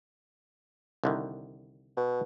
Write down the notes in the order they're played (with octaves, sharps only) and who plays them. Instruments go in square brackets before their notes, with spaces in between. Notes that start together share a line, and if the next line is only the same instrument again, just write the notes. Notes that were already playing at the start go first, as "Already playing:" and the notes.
[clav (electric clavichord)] C2 D3 D#3
[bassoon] B2